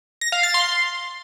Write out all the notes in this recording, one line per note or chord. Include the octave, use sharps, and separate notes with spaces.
A#6
F5
A6
C6